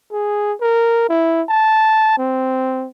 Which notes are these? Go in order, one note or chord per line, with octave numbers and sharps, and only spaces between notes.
G#4
A#4
E4
A5
C4